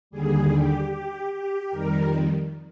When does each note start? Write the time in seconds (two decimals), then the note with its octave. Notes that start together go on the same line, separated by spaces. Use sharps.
0.11 D#2 D3 G3 G#4
0.51 G4
0.91 G4
1.31 G4
1.70 F2 D#3 G3 A#4